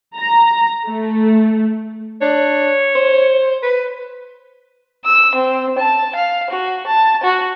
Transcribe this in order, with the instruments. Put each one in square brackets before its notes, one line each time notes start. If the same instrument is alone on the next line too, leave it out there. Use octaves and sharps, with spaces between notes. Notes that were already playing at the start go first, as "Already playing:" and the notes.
[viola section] A#5
A3
[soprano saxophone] D4 [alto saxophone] C#5
[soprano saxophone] C5
B4
[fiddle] E6
C4
A5
F5
F#4
A5
F#4